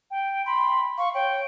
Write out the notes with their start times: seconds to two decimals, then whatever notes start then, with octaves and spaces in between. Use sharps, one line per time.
0.11 G5
0.46 B5 C6
0.98 F5 C#6
1.14 C#5 G5